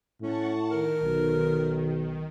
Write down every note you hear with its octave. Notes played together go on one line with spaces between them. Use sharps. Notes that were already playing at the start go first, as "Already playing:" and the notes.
A2 C#4 F#5 A5 C#6
D#3 A#4
B1